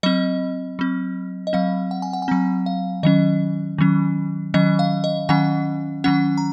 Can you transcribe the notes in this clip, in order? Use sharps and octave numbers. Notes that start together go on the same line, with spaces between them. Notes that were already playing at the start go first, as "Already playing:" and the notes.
F#3 C4 D#5
F#3 C4
D#5
F#3 C4 F5
F#5
G#5
F#5
G#5
F#3 C4 A#5
F5
D#3 F#3 C#4 D#5
D#3 F#3 C#4
D#3 F#3 C#4 D#5
F5
D#5
D#3 F#3 C#4 F#5
D#3 F#3 C#4 F#5
A#5